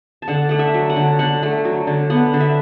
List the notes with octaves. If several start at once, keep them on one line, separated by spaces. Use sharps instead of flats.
A5
D3 F#5
A3 F#5
E5
F#3
F#5
D3
D3 F#5
A3
F#3
D3
B3 F#5
D3
E5